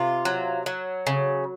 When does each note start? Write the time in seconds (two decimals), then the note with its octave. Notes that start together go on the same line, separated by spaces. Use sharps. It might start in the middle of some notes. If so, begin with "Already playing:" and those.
Already playing: C3 F4
0.25 F#3
0.66 F#3
1.07 C#3